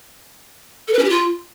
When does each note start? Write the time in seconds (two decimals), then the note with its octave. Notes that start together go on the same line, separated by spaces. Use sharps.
0.88 A4
0.93 B4
0.99 C#4
1.04 G4
1.10 F4